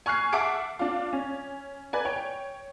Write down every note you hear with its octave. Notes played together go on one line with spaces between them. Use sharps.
G#5 C#6 F6 F#6 C7
E5 F#5 A5 D6 C7 D7
D4 F4
C#4
B4 D5 G#5
C#5 G5